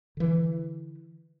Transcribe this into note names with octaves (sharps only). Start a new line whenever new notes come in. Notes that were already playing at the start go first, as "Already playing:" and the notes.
D3 E3